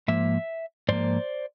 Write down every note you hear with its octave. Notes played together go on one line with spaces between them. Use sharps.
G#2 F3 A#3 E5
G#2 F3 A#3 C5 D5